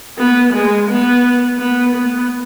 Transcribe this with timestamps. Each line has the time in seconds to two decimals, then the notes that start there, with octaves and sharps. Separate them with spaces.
0.17 B3
0.53 G#3
0.88 B3
1.59 B3
1.95 B3